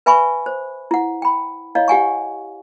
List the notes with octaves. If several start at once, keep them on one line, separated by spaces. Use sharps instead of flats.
B4 E5 G#5 B5 C#6
C5
E4 F#5
G5 B5
E4 C#5 D#5 F5
G4 F#5 G#5 C#6